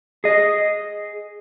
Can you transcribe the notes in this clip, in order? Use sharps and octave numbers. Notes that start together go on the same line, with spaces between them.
G#4 D#5